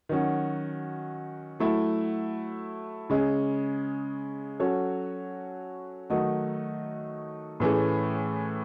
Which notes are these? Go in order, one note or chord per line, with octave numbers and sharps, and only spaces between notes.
D#3 F#3 C#4 F#4
F#3 A3 E4
C#3 G#3 C#4
F#3 C#4 F#4 A4 C#5
D#3 F#3 A3 D#4 F#4
A2 E3 A3 C#4 G#4